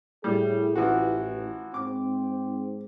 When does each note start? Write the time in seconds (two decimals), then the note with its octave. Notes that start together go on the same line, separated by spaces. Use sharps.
0.24 A2 G3 G#4
0.76 A1 E3 F3 F#4
1.74 G#2 C4 D6